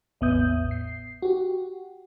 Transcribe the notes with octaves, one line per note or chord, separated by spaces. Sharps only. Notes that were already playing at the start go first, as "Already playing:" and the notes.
A1 E2 B3 E5 D#6 G6
C7
F#4 G4